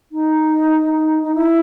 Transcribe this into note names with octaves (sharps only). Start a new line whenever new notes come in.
D#4
D#4
D#4
E4